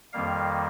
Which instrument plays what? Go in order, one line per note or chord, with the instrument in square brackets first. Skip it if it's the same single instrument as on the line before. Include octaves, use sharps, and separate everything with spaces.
[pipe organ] F2 D#3 G3 A#3 F5